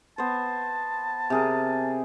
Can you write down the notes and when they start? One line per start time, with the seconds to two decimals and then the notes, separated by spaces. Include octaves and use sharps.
0.18 B3 C5 A5
1.30 C3 G#4 A#4